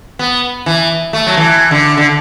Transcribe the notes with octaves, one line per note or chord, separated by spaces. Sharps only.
B3
E3
A3
F#3
E3
D3
D3